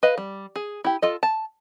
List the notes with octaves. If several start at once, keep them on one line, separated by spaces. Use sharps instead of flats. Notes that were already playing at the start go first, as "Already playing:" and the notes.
B4 D#5 F5
G3
G#4
E4 G4
F4 A4 D#5
A5